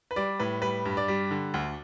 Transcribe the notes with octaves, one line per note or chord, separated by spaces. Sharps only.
B4
G3 D5
A2 B4
G3 B4
G2
D5
G3
D3
D2